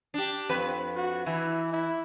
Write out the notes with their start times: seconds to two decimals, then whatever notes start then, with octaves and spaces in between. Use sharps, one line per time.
0.14 D4 G4
0.49 F2 C4 B4
0.95 F#4
1.26 E3 E4
1.72 E4